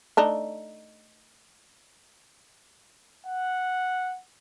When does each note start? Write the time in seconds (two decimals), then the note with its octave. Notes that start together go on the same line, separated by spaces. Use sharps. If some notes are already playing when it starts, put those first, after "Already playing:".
0.17 A3 D4 D#4
3.27 F#5